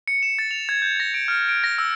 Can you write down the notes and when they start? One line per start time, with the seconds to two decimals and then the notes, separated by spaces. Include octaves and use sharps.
0.08 C#7
0.23 E7
0.39 A6
0.51 F7
0.69 G#6
0.82 G6
1.00 A#6
1.14 D7
1.28 F6
1.49 D7
1.64 A#6
1.78 E6